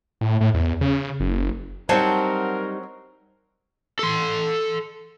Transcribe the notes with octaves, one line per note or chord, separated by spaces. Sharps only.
A2
A2
E2
C#3
F#1
F#3 G3 C4 D#4 A#4 F#5 A5
A4 C6